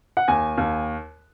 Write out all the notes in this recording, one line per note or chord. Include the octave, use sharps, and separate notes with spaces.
F#5
D#2 G#5
D#2